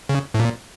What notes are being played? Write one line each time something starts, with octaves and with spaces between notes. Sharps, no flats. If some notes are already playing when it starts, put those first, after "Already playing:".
C#3
A2
A#2